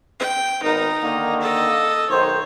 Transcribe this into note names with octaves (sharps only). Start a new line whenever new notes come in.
G5
G#1 B3 D#4 A#4
D3 D#3 A#3
A4 D#5
B1 D#3 C5 C#5